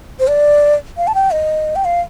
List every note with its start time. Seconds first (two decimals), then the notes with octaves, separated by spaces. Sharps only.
0.19 C5
0.27 D5
0.97 F5
1.07 A5
1.15 G5
1.33 D#5
1.76 G5
1.85 F5